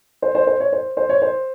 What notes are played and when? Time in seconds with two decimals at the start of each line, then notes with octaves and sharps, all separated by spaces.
0.22 C5
0.35 C5
0.47 C5
0.60 C#5
0.72 C5
0.97 C5
1.09 C#5
1.22 C5